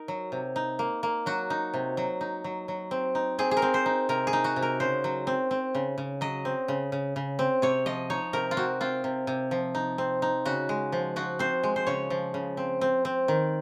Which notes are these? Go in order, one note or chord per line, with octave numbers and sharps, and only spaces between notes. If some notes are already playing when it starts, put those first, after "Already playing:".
Already playing: D#4 A#4
F#3
C3
D#4
A#3
A#3
F#3 F#4
D#4
C3
F#3
D#4
F#3
F#3
C4
D#4
C4 G#4
G#4
A#4
C4
C5
D#4
C3 A#4
G#4
D#4
F#4
C3
A#4
C#3 C5
F#3
C4
C4
C#3
C#3
F#3 D#5
C4
C#3
C#3
C#3
C4
C3 C#5
F3 D#5
D#4 C#5
C3 A#4
F4
C4 F#4
C4 F4
C3
C3
F3
D#4
C4
D#4
C#3 F#4
G#3
F3
F3 F#4
C4 C5
G#3
C5
C#3 C#5
F3
C#3
C4
C4
C4
D#3